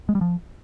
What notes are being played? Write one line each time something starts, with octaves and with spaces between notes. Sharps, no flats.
G#3
G3
F3